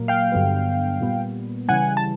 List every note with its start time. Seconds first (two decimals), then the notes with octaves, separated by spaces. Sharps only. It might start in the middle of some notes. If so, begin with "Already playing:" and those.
Already playing: A#2 F#3 A#3
0.08 F5 G5
0.32 G2 D3 F#3 B3
1.01 A#2 G3 B3
1.68 C#3 E3 G3 F#5 G#5
1.97 A5